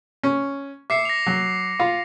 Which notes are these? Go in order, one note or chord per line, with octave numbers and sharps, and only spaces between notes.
C#4
E5 D6 C7 C#7
A#6 F7
F#3
F4